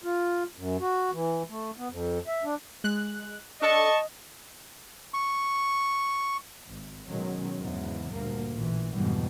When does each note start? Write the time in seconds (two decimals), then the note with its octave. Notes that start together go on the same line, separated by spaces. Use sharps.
0.04 F4
0.57 F#2
0.80 F#4
1.13 E3
1.50 A3
1.78 B3
1.91 F2
2.27 E5
2.44 D4
2.84 G#3 F#6
3.62 D4 A4 D#5 A5 C#6
5.14 C#6
6.67 G#1
7.09 B2 D#3 F#3 G#3 C#4
7.59 E2 G#2 C#3 E3
8.12 D2 G2 A#2 G3 A#3
8.53 A1 A#2 E3
8.95 F2 G#2 B2 D3 E3 G3